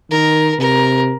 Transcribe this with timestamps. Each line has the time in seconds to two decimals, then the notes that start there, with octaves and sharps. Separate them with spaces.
0.11 D#3 A#4
0.60 C3 A#4